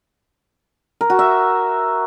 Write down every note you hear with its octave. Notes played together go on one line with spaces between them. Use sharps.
A#4
F#4
E5